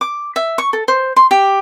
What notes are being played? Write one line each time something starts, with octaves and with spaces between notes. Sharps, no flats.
D6
E5
C#6
A4
C5
C6
G4